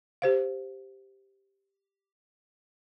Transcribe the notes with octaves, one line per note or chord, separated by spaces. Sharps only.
G4 C5 F5